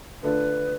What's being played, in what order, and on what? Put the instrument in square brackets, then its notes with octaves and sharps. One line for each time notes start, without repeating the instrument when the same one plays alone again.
[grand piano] D3 A3 D4 F4 [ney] B4